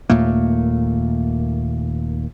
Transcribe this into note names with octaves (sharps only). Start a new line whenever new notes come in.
D#2 A#2 A3 A#3